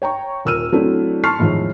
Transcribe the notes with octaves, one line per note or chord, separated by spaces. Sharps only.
C#5 G5 A#5 C#6
D#1 A#4 E6 F6 D#7
F#3 A3 C4 D4 E4
A5 C6 C#6 F6 C7
E2 A2 D#3 F3 G#3